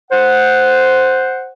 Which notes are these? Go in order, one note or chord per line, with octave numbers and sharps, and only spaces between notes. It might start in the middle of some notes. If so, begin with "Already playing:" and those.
C5 F#5